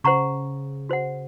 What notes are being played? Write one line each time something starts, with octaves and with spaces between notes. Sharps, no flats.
C#3 C5 F#5 A#5 C#6
F#4 C5 F#5